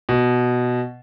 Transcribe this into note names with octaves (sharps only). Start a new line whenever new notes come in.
B2